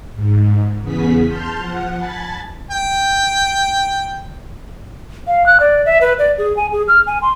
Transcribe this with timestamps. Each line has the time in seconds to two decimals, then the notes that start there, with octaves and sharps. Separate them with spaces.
0.14 G#2
0.81 E2 C#3 B3 G#4 B6
1.27 A5 C6 F6 G6
1.58 F3 F#5
1.97 G#5 A5 B5 A6
2.71 G5
5.27 F5
5.46 F#6
5.60 D5
5.86 E5
6.01 B4
6.19 D5
6.38 G#4
6.57 G#5
6.72 G#4
6.88 F6
7.07 G#5
7.22 C6